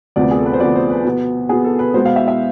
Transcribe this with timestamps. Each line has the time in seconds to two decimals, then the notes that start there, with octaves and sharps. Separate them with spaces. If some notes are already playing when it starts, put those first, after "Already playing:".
0.16 D2 C3 F3 B3 D5
0.31 G#4
0.39 A4
0.46 B4
0.53 C5
0.60 D2 C3 F3 B3 D5
0.75 C5
0.90 B4
1.05 B2 B3
1.49 B2 B3 G#4
1.64 A4
1.79 B4
1.94 B2 G#3 B3 C5
2.05 F5
2.16 E5
2.28 E5